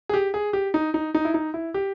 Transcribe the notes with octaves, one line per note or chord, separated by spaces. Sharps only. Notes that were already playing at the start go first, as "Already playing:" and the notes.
G#4
G4
G#4
G4
D#4
D#4
D#4
E4
D#4
E4
G4